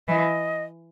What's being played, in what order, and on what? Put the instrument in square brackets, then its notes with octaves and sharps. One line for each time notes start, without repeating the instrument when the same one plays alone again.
[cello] E3 [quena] D#5